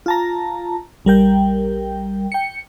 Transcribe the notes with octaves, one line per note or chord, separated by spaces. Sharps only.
F4 A5 A#5
A#1 G3 A#4 G5
G5 C#7